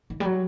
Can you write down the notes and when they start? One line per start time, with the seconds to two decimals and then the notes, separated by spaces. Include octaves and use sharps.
0.10 D#3
0.20 G3
0.25 F#3